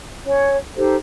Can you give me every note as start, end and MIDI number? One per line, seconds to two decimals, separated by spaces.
0.25 0.56 61
0.25 0.56 73
0.76 0.95 63
0.76 0.95 67
0.76 0.95 69
0.76 0.95 72